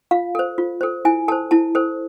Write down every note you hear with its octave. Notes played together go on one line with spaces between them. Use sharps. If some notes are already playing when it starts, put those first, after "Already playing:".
F4 F5
A4 C5
F4
A4 C5
E4 G#5
A4 C5 A5
E4 A5
A4 C5